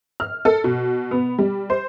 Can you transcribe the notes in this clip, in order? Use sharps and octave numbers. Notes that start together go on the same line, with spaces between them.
F6
A4
B2
B3
G3
C5